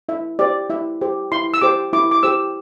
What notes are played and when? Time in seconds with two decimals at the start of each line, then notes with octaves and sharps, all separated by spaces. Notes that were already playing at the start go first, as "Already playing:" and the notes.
0.09 E4 E5
0.39 G4 C5 D5
0.70 E4 E5
1.01 G4 C5
1.32 E4 C6
1.54 E6
1.61 G4 C5 D6
1.93 E4 D6
2.11 D6
2.23 G4 C5 E6